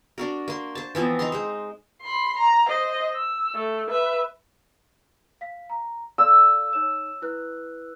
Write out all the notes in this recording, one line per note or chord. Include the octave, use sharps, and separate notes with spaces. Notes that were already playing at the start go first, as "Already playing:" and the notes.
D4 F#4 A#4
A#3 C6
C5 A5
E3 F3 B3 C4
D#4 A#5 C6
G#3 C5
B5 C6
A#5
C5 D#5
E6
A3
B4 E5
F5 B6
A#5
A4 D5 F5 E6
D#4 C#5 E7
E4 B4 F#6